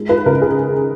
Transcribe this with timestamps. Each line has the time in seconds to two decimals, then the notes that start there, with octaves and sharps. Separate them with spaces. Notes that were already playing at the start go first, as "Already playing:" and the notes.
Already playing: D#3 G#3
0.09 B4
0.26 C#2 A#4
0.42 G#4